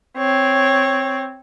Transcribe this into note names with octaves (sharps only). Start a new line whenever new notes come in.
C4 C#5